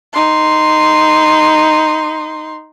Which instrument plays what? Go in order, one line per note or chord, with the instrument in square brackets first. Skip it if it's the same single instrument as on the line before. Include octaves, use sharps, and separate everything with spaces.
[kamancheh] D#4 C6